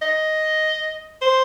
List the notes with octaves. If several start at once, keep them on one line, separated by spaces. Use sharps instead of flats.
D#5
C5